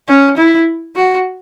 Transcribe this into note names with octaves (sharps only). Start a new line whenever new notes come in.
C#4
E4
F#4